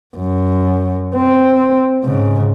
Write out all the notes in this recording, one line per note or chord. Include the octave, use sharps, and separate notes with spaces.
F#2
C4
G#2 C#3